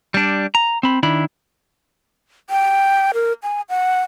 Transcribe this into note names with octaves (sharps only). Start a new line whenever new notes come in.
G3 D4
A#5
C4 B5
D#3 D4 E4 B5
G5
A#4
G#5
F#5